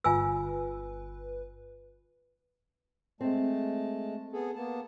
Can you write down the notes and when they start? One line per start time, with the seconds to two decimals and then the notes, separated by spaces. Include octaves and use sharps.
0.04 G1 F4 B4 G#5 E6
3.21 G#3 A3 C4 A5
4.33 B3 G#4 A4
4.56 A#3 B3 A5